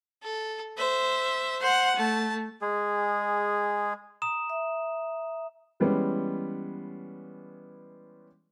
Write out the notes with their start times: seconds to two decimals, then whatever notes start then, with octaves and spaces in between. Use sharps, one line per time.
0.23 A4
0.78 C5 E5
1.61 C5 F#5
1.97 A3 A5
2.61 G#3 G#4
4.22 A#5 D#6 E7
4.50 E5
5.80 E3 G3 G#3 B3 C#4